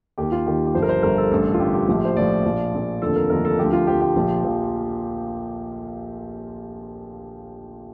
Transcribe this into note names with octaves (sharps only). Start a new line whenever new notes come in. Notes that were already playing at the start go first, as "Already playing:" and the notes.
D#2 D#3 G4
F4
D#2 D#3 G4
G4
G1 G2 F3 C5
A#4
C5
G1 G2 F3 A#4
A4
A1 G2 D3 A4
F4
A1 G2 D3 G4
G4
A#1 A2 F3 G4
C5
A#1 A2 F3 D5
A#1 A#2 F3
A#1 A#2 F3
F1 D#2 D3 F3 A4
A#4
F1 D#2 D3 F3 A#4
A4
D2 D3 F3 G4
F4
D2 D3 F3 G4
G4
A#1 A#2 F3
A#2 F3